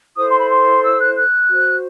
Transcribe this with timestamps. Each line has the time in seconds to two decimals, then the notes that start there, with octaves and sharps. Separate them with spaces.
0.16 E4 A4 C5 D#6
0.28 C6
0.39 B5
0.50 C6
0.82 E6
0.99 F#6
1.15 F#6
1.48 F#4 C5